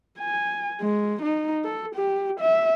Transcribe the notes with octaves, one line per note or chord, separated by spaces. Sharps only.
G#5
G#3
D#4
A4
G4
E5